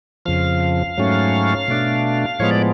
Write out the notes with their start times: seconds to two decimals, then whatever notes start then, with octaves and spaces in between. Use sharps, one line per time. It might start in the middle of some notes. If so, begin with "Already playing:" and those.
0.26 F2 C#3 F3 F5
0.98 G#2 F#3 A3 C#4
1.68 B2 A3 D4
2.39 A2 F3 G#3 B3 C#5
2.51 D5